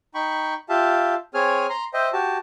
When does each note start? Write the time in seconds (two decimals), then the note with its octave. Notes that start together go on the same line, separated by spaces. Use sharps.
0.15 D#4 G5 B5 C#6
0.69 F4 G4 E5 F5 A5
1.34 C4 G#4 C#5 G#5 F6
1.70 A#5 C6
1.94 C5 D#5 E5 G5
2.13 F#4 G4 A5